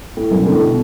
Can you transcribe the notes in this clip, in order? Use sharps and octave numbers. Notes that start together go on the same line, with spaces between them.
A2
F#2 B2
A2 D3
B2